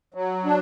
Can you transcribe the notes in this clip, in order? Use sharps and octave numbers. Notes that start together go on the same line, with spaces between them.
F#3
D4